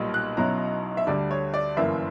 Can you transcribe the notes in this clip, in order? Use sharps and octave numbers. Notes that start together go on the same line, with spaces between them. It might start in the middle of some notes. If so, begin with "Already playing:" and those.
Already playing: B1 A#2 G3
F#6
B1 B2 F#3 C#4 E4 A#5
E5
D2 D3 G3 D5
C#5
D5
G1 F#2 E3 A#3 E5